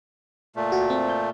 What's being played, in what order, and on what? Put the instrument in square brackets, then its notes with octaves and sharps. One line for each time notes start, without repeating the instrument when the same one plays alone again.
[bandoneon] A#2 A3
[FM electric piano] F#4
C4
G6